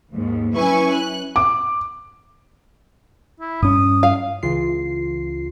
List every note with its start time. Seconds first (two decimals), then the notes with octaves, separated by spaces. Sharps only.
0.12 D#2 G#2
0.54 F#3 C#4 E4 B4 G#5 C#6
0.93 F#6
1.36 D6
3.40 E4
3.62 G2 C#4 D#6
4.03 F5
4.43 C#2 C#3 E3 F4 C7